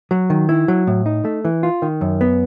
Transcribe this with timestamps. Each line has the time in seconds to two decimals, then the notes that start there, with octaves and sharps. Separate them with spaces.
0.11 F#3
0.30 D#3
0.49 E4
0.68 F#3
0.87 A2
1.06 D#4
1.25 A3
1.45 E3
1.63 F4
1.82 D#3
2.01 F#2
2.21 B3